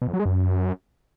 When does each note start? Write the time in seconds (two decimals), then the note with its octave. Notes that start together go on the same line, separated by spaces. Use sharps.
0.02 B2
0.08 F2
0.14 F#3
0.20 G#3
0.25 F#2